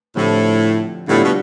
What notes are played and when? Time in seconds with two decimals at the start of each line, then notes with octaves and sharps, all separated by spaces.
0.16 A2 D3 F3 C4 G4
1.07 A2 D3 G3 B3 F4
1.23 B2